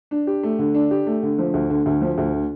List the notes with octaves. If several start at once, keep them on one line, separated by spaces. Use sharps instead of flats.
D4
G4
A3
D3
D4
G4
A3
D3
F3
D2
D3
D2
F3
D2
D3